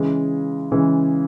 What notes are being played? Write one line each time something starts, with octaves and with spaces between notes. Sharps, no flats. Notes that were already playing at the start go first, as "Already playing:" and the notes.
Already playing: C#3 E3 G#3
C#3 E3 G#3